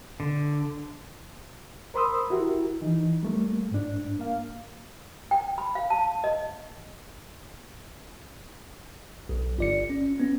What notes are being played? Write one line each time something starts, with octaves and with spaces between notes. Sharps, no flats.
D3
A#4 C5 B5 C6 D#6 E6
E4 F#4 G4 A#4
E3 D#4
G3 A3 A#3
G#2 D4
A#3 F5
G5
B5
F5
A5
D#5
B1
G1 D5 C#7
C#4
B3 C#4